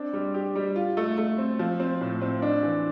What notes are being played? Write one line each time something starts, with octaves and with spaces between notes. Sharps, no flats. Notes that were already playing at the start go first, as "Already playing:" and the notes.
Already playing: C4 D4
G3
G4
G3
F4
A3
A3
C4
F3
C4
A2
C4
D4
E3